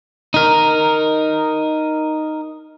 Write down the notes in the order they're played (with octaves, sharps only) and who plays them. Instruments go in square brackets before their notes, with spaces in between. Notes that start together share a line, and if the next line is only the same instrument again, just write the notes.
[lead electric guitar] D#4 A#4